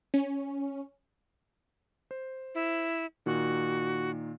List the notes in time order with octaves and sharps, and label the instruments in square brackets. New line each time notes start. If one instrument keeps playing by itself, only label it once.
[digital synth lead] C#4
[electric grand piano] C5
[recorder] E4
[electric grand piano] A#2 D#3 [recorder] F#4